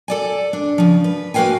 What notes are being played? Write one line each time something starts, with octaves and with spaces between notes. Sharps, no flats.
A4 D5 G#5
D4
C#3 F3
B4
A#3 F#4 B4 F5 G5 G#5